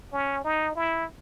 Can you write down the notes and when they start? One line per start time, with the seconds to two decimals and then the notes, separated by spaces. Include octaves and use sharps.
0.13 C#4
0.44 D#4
0.76 E4